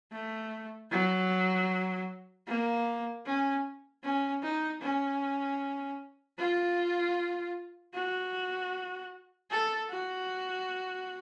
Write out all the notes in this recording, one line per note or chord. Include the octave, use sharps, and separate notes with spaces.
A3
F#3
A#3
C#4
C#4
D#4
C#4
F4
F#4
A4
F#4